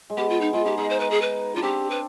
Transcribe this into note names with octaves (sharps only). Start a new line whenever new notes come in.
G#3
B3 G4
F4
D#4
G#3 F4
D#4 G4
D#4 G#4
C5
B4
G#4
B4
D4 F4
C4 G4
B4